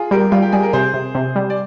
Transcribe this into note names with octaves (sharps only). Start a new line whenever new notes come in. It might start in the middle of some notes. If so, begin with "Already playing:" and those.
Already playing: F4 G#4
G3 G4 A#4
G3 F4
G4
G3 G#4
A#4
C3 G#4 C5
C3
C3
G3
D5